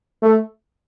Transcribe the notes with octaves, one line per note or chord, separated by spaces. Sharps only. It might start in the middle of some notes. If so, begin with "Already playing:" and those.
A3